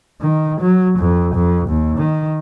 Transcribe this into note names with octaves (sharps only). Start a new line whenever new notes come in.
D#3
F#3
F2
F2
D#2
D#3